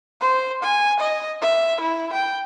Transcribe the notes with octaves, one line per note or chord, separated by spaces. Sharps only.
C5
G#5
D#5
E5
E4
G5